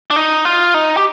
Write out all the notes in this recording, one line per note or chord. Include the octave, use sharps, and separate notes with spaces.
D4
D#4
F4
D#4
G4